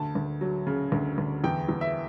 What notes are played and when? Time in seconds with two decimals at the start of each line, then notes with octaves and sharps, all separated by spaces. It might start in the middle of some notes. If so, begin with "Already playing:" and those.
Already playing: D2 A5
0.15 D2
0.41 F#3
0.67 C#3
0.92 D2
1.18 D2
1.44 E2 G5
1.69 E2
1.81 E5